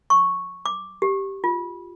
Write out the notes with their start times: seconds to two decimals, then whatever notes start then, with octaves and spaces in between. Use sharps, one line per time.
0.10 C#6
0.66 D6
1.02 G4
1.44 F4